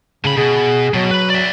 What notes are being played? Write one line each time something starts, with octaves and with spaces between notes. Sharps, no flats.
A2 C#3 B5
B2 G#4
B2 F#3
B4 B5
D5 E5